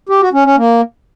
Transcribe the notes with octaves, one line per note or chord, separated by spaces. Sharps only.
G4
F#4
C#4
C#4
A#3